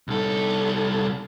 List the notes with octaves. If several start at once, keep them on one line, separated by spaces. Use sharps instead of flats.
C2 A4